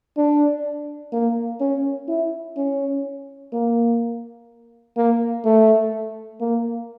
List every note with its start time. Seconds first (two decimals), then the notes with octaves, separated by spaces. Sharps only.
0.17 D4
1.13 A#3
1.61 C#4
2.09 E4
2.57 C#4
3.53 A#3
4.97 A#3
5.45 A3
6.41 A#3